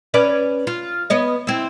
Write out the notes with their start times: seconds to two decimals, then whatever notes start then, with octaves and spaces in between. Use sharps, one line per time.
0.14 C#4 B4 D5
0.67 F4
1.10 B3 C#5 D#5
1.47 C4 E4